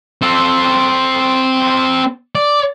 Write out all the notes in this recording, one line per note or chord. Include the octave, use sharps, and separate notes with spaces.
C4 A4
D5